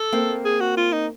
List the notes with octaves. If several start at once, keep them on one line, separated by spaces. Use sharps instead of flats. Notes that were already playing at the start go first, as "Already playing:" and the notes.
Already playing: A4
A#3 C4
G#4
F#4
F4
D#4